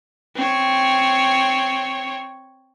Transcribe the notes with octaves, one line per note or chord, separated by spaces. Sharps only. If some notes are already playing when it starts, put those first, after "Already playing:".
C4 C#5